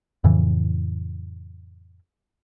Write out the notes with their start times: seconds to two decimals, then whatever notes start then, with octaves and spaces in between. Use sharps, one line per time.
0.24 F2 A2 C#3 E3